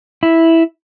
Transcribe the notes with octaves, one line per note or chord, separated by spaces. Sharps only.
E4